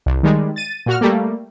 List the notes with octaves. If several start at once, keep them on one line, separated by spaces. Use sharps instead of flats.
C2
D#3 G3 G#3
A6 D#7
A#2 F#4 F6
G3 A3 A#3